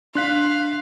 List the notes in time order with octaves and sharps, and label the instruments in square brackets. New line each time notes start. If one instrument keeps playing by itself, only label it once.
[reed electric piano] D4 [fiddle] F5 [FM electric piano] C6 F#6 B6